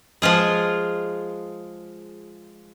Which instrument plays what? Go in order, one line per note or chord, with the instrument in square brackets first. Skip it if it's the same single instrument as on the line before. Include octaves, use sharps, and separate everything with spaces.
[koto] F3 G#3 F4 G#4